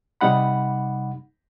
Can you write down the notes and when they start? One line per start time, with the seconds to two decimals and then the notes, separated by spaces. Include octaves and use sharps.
0.21 C3 G3 D#4 F#5 B5